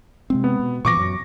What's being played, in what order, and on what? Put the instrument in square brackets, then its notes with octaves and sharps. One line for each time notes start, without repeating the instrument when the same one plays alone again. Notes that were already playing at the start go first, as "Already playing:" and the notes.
[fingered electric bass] C3 G#3 C4
[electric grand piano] B3
[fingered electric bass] B2
[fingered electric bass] A#2 E3 F3 [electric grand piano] C#6 D6 A#6
[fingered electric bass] F#2 F#3